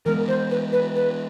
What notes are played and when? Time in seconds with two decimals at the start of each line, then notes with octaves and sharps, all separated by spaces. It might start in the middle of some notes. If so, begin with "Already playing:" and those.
0.05 E3 G#3 B3 A#4
0.28 C5
0.51 B4
0.72 B4
0.96 B4